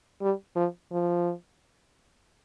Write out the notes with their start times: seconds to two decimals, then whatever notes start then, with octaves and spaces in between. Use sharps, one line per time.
0.22 G3
0.56 F3
0.91 F3